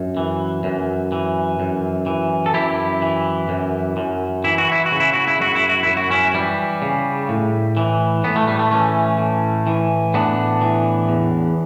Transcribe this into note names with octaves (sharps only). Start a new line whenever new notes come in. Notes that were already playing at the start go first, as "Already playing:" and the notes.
Already playing: F#2
E3
F#2
E3
F#2
E3
A4
F#2 E4 G4
E3
F#2
F#2
E3 E4
F#4
E4
F#4
C#3
E4
F#4
E4
F#2 F#4
E4
F#4
F#2 E4
F#4
C#4 E4
E3 G3
C#3
A2
E3
A2 B3
A3
G3
A3
E3 A3 C#4
A2
E3
A2 B3 D4
E3
E2